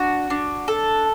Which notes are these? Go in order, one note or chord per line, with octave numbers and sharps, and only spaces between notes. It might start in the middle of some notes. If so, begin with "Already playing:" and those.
Already playing: D4 F#4
D4
A4